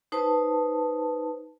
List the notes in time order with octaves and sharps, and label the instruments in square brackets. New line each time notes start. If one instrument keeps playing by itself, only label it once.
[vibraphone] D#4 B4 C5 A5